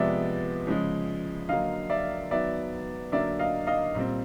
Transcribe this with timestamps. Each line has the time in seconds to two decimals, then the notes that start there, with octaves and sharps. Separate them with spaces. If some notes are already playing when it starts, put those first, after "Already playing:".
Already playing: C3 F3 G#3 B3 D5 E5
0.67 C#3 F3 G#3
1.49 D3 F#3 A#3 D#5 F5
1.90 D5 E5
2.31 D#3 F#3 B3 D5 E5
3.12 D3 F#3 A#3 D5 E5
3.39 D#5 F5
3.67 D#5 F5
3.95 A#2 G3 C4